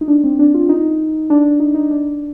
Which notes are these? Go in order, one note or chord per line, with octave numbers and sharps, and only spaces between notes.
D#4
D4
C4
D4
F4
D#4
D4
D#4
D#4
D4